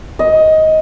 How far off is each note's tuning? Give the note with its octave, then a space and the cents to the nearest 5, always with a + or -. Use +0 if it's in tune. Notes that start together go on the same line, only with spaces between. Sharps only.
D#5 +15